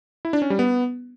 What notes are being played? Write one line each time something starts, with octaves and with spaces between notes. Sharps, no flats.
E4
D4
C#4
G3
B3